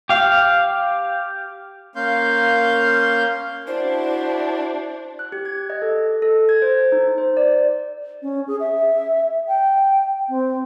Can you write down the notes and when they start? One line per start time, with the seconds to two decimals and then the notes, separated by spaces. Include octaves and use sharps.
0.09 G4 F5
1.96 A#3 C#4 F5 C6 G6
3.67 D4 E4 F#4 C5
5.19 F#6
5.32 G4
5.45 G#6
5.70 D#5
5.82 A4
6.22 A4
6.49 G#6
6.62 C5
6.92 D#4
7.18 C5
7.37 D5
8.22 C#4
8.48 G#4
8.60 E5
9.48 G5
10.29 C4